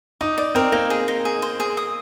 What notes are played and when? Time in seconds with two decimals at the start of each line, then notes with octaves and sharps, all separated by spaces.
0.21 D#4 D6
0.38 D5
0.55 C4 A#4
0.72 A#3 D#4
0.90 G#4
1.08 D#4
1.25 G#4
1.42 C5
1.60 G#4
1.77 D#6